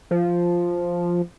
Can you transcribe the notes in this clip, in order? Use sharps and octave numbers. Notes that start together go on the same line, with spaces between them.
F3